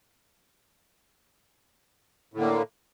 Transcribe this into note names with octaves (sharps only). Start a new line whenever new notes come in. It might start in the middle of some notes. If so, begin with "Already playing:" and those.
A2 D3 A#3